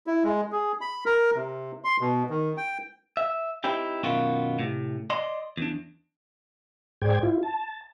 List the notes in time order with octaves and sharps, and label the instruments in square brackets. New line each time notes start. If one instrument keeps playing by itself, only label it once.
[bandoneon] E4
G#3
G#4
B5
A#4
C3
C6
B2
D#3
G5
[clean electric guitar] E5
C4 D#4 E4 G4
F#2 B2 D#3 B3 F4 F#4
A2 C3
D5 D#5 C6
E2 D4
[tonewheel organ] G#2 G#4 C5 D5 G5 G#6
E4 F4
A5